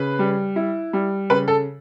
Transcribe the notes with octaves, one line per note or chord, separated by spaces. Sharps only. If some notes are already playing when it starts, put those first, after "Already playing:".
Already playing: C#3 B4
G3
E4
G3
C#3 B4
A4